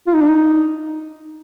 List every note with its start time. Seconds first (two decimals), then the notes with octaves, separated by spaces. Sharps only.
0.07 F4
0.14 D#4
0.21 D4
0.29 D#4